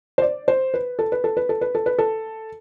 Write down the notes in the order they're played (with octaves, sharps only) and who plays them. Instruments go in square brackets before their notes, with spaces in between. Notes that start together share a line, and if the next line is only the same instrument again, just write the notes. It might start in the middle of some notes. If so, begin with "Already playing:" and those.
[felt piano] C5
D5
C5
B4
A4
B4
A4
B4
A4
B4
A4
B4
A4